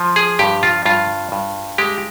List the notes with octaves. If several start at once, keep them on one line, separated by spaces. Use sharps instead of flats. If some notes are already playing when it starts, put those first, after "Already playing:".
Already playing: F3
G#4
G2 G4
F4
G2 F4
G2
G#3 G4